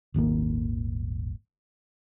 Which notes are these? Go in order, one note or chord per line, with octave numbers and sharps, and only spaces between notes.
D#1 G#1 D#3 A#3